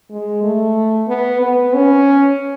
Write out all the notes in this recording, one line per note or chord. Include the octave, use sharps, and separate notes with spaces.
G#3
A3
B3
B3
C#4